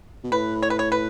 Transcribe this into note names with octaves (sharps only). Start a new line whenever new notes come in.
B2
A2 B4
C#5
B4
C#5
B4